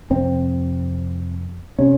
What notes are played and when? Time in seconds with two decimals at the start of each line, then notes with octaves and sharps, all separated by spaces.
0.10 F2 C3 C4
1.79 C3 C#4